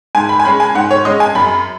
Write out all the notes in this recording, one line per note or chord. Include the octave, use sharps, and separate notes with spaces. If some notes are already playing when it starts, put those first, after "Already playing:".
G#2 G#5
B5
G#5
G#3 C#4 B5
G#5
G#2 F#5
C#5
G#3 C#4 D#5
G#5
F#2 B5